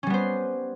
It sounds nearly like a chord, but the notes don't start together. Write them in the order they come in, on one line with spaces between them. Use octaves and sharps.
C#4 G3 B3 C5